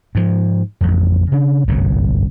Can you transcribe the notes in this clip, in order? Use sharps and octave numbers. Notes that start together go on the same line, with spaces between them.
G#2 F3
A1 F2
C#3 D4
G1 C2 F#2 A2